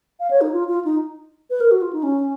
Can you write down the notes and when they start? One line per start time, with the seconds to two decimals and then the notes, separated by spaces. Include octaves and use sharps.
0.20 F5
0.31 C#5
0.41 D#4
0.52 F4
0.68 F4
0.85 D#4
1.50 B4
1.60 A#4
1.71 F#4
1.82 F4
1.93 D#4
2.03 C#4